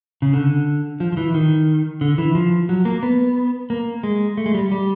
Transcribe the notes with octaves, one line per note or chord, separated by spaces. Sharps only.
C#3
D3
F3
F3
E3
D#3
D3
E3
F3
F#3
A#3
B3
A#3
G#3
A3
G#3
G3
G3